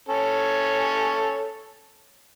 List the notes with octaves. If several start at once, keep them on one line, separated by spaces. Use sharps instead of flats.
C#4 A4 C#5